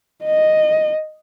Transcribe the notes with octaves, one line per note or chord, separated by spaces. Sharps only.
D#5